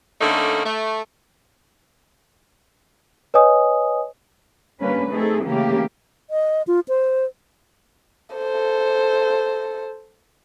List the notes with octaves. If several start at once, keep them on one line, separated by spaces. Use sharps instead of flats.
D3 A3 A#3 C#4 D#4
A3
B4 C#5 D#5 G#5 D#6
D3 G3 A#3 C#4 B4
A3 C4 D#4 G#4 A4
C#3 E3 A3 A#3 G4
D#5
F4
C5
A4 C5